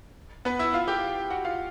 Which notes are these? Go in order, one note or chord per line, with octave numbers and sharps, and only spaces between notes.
B3 B4
E4 E5
F4 F5
G4 G5
F#4 F#5
F4 F5